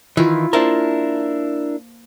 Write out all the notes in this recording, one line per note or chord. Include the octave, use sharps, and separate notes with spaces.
D#3 E3 E4 F4
A#3 D4 E4 A#4 C5 A5